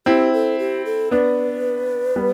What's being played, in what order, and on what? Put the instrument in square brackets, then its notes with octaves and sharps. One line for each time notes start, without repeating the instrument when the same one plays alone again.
[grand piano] C4 E4 [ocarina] G4
[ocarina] A4
G4
A4
[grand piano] B3 D4 [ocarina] B4
[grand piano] G3 B3